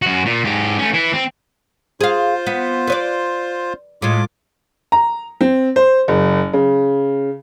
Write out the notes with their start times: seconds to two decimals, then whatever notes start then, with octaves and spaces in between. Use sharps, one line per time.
0.02 F#2 F#4
0.25 A#2
0.44 G#2 G4
0.79 A3 C#4
0.94 E3 E4
1.14 C4
2.01 F4 G#4 C5 F5
2.47 B3
2.87 B4 C#5 D5
4.02 A2 G#3 F4 D6
4.92 A#5
5.41 C4
5.76 C5
6.08 F#1
6.53 C#3